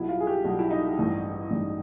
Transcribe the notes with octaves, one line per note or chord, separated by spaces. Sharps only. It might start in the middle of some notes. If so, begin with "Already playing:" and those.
Already playing: B1 B2 G3 E4
F4
G#4
G4
B1 B2 G3
E4
D#4
A1 G2 D#3
A1 G2 D#3